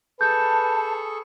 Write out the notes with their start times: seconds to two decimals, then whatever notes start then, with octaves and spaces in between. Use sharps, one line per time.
0.21 G#4 A4 B4 A5 C#6 G6